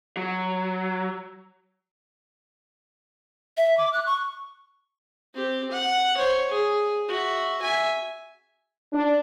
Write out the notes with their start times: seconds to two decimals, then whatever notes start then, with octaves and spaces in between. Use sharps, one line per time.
0.17 F#3
3.57 E5
3.77 D6
3.93 F#6
4.06 C#6
5.34 C4 G4
5.71 F#5
6.17 C5 C#5
6.50 G#4
7.09 F#4 E5
7.62 E5 G#5
8.92 D4